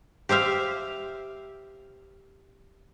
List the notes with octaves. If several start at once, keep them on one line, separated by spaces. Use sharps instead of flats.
G4 C5 E5 F5